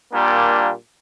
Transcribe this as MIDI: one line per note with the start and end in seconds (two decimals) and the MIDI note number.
0.13 0.71 46
0.13 0.71 55
0.13 0.71 58
0.13 0.71 62